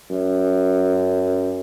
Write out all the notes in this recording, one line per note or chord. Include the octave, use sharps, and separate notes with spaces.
F#2